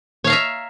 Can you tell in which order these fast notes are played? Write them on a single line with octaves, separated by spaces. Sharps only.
C#5 F5 A#5 E5